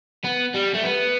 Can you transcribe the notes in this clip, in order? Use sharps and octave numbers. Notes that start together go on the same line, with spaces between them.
B3
G3
A3
B3